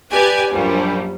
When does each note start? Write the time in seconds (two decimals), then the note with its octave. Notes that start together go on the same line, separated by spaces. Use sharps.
0.11 G4 B4 D5 G#5
0.50 A#1 F#2 G3